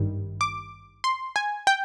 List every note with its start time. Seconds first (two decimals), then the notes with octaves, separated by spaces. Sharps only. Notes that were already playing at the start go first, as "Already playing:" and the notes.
Already playing: G#1 G2 D#3 G3
0.41 D6
1.04 C6
1.36 G#5
1.67 G5